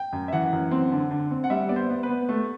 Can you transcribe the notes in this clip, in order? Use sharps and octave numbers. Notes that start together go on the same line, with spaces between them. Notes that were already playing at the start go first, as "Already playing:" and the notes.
Already playing: G5
F#2
E5
E3 F#5
F#2
C4
D3
D3
C4
F#5
G3 E5
B3 D5
C5
B3
B4
B3
A3